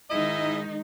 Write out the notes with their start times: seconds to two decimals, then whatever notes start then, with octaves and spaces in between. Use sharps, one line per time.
0.11 G#2 D#3 G#3 D#4 E4 D#5